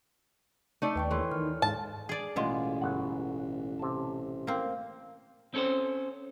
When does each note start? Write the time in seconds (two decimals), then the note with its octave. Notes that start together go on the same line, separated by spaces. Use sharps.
0.82 A3 D#4 D5
0.96 D#2 B4 G5 C#6
1.11 E3 A4 C#5 C6
1.32 D#3 F6
1.62 G#2 A5
2.09 G#4 D5
2.36 A1 B2 G#3 B3 F4
2.81 G1 F#5
3.79 C3 A5
4.47 A#3 C4
5.54 C4 C#4 A4 B4 C5